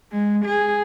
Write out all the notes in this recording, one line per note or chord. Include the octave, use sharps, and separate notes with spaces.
G#3
G#4